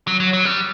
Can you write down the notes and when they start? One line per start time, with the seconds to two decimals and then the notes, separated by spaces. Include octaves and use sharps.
0.07 F#3
0.20 F#3
0.33 F#3
0.45 G3